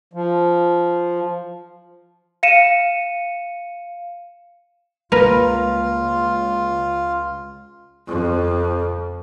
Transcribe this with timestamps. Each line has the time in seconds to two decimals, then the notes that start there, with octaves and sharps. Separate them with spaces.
0.13 F3
2.43 F5 C#7 D#7 E7
5.12 C#2 G3 A#3 F4 A#4 B4
8.08 F2